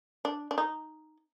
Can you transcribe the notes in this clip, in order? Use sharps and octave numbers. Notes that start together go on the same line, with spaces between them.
D4
D4
D#4